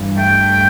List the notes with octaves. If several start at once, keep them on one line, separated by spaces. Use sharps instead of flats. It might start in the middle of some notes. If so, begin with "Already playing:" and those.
Already playing: G2 E3
A3 G5